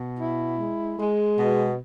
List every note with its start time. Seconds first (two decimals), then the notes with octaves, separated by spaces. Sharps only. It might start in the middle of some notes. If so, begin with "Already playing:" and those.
Already playing: B2
0.18 E4
0.59 G#3
0.99 G#3
1.38 B2